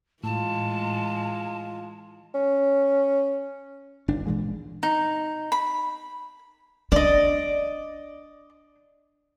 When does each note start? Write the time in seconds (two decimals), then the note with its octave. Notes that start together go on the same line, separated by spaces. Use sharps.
0.24 A2 E3 G#3 F4 A5
2.34 C#4
4.08 G1 D4
4.27 A#2 E3 G#3
4.83 D#4
5.52 B5
6.92 D4 D5 D#5